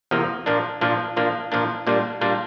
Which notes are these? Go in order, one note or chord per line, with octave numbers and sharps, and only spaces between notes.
E2 C3 F3 A#3
A#2 F3 A#3 D4
A#2 F3 A#3 D4
A#2 F3 A#3 D4
A#2 F3 A#3 D4
A#2 G3 A#3 D4 F4
A#2 G3 A#3 D4 F4